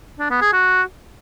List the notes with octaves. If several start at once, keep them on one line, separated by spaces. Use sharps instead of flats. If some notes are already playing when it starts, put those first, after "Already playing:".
D4
B3
G#4
F#4